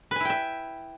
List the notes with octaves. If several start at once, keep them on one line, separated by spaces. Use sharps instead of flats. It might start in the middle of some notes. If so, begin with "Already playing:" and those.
E4 B4 E5 G5 G#5